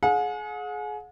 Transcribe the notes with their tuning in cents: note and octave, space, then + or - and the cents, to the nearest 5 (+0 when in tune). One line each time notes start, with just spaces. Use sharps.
G#4 +30 F#5 -40